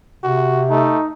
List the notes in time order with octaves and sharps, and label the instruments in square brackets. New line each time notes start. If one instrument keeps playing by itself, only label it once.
[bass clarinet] C3 [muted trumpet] F#4
[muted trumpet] A3 [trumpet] D#4